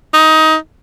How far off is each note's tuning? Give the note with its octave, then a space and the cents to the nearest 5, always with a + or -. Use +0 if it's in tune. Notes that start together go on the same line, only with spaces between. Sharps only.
D#4 +20